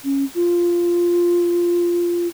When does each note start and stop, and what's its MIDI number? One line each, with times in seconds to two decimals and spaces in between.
0.04 0.24 61
0.35 2.28 65